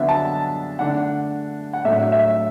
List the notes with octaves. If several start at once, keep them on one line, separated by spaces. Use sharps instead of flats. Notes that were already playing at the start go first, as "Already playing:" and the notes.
Already playing: D3 F#3 B3 D4 E5
A5
D3 A3 D4 F#5
F#5
A2 F#3 A3 D4 E5
E5